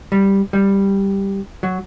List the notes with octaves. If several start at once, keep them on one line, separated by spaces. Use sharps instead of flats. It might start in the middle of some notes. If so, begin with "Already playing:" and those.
G3
G3
F#3